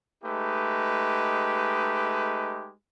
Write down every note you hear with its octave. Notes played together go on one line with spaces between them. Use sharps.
G#3 A3 D#4 G4 B4